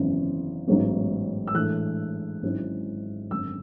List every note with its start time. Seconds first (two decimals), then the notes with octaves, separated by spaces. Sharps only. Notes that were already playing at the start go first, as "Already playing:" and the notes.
Already playing: G#1 F#2 C#3 E3 B3
0.67 A1 G#2 F#3 B3
1.47 E6
1.54 A2 E3 G#3 D4 F#6
2.42 G#1 G#2 F#3 C#4 E4
3.31 G#1 F#2 D3 G#3 E6